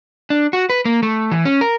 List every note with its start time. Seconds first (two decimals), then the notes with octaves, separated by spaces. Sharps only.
0.30 D4
0.53 F#4
0.70 B4
0.85 A#3
1.03 A3
1.31 E3
1.45 C#4
1.61 A#4